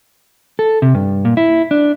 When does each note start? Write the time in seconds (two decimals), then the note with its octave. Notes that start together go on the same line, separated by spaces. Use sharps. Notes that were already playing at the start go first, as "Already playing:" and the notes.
0.59 A4
0.82 C3
0.95 G2
1.25 A#2
1.37 E4
1.71 D4